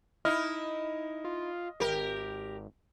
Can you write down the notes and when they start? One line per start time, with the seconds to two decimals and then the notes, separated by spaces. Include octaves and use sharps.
0.25 D#4 E4 D#5 F6
1.25 F4
1.80 G#1 G4 A#4